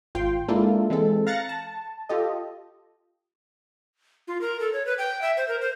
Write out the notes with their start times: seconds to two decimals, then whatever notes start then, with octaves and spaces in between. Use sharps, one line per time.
0.15 G#1 F4 G5 C6
0.48 G#3 A#3 D4 E4 F4 A4
0.90 E3 G#3 C4 A4
1.27 F5 A#5 F#6 A6 A#6 C#7
1.49 A5
2.09 F4 G4 A4 D#5
4.28 F4
4.41 A#4
4.60 A4
4.73 C#5
4.86 B4
4.98 G5
5.22 E5
5.37 C5
5.48 A#4
5.61 C5